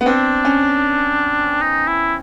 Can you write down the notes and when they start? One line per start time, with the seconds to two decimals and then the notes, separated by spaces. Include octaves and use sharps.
0.01 B3
0.06 C4 D4
0.45 C#4
1.62 D#4
1.87 E4